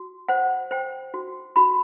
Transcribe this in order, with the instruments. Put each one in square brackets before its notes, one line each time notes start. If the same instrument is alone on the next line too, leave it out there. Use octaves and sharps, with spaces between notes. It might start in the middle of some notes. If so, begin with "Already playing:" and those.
Already playing: [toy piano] F#4
C5 F#5
C5 G5
F#4
F#4 B5